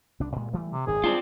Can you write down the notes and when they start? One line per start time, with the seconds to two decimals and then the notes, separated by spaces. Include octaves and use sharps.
0.20 C2 D4
0.34 G2 A#2 G#3
0.53 E3 G3 A3
0.73 C3
0.87 G#1 F#2 D#3 G#4
1.04 G3 G#3 C4 D4 F4